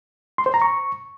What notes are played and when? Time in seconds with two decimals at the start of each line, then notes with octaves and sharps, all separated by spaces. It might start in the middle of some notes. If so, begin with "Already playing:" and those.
0.38 C6
0.46 C5
0.54 A#5
0.62 C#6